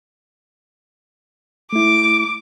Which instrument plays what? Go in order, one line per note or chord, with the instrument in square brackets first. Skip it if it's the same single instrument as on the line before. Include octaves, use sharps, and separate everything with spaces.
[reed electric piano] A3 E4 [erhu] D6